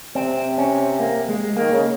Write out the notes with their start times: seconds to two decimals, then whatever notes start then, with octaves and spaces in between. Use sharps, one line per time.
0.15 C3 C4
0.58 C#4
1.00 A#3
1.28 G#3
1.57 D#3 A#3
1.72 C#3